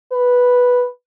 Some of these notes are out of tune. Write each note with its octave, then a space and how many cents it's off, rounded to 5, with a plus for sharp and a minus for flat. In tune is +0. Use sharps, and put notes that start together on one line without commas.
B4 -5